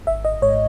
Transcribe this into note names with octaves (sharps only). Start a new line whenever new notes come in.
G#1 E5
D#5
G#2 C#5